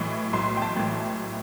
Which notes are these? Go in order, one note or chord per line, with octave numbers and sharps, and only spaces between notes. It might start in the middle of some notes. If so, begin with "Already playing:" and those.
Already playing: B1 A2 E3
B1 C6
G5
A5
A2 E3